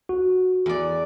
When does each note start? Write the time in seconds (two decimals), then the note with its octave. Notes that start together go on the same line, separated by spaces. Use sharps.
0.09 F#4
0.66 E2 D5